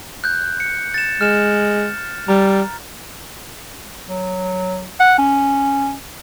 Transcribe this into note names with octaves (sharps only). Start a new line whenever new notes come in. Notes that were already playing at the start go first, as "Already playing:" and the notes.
F#6 G6
C#7
A6 E7
G#3 F6 E7
G3 A#5
F#3
F#5
C#4